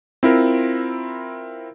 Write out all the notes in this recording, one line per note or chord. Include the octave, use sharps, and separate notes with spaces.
C4 E4 F4 A#4